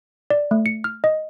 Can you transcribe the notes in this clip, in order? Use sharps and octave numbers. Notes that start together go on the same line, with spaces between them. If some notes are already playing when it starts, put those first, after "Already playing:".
D5
A3
C#7
F6
D#5